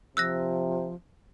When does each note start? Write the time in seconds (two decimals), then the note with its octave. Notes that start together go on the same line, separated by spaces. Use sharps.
0.17 C3 F3 E6 F#6 A#6